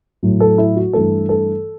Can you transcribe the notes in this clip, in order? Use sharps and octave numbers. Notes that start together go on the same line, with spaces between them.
A2 F#3 A3
A4
E4
F#4
G2 E3 A3 A4
A4